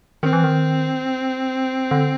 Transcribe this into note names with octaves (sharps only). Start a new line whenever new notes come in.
D#3 C4
E3
D#3
D3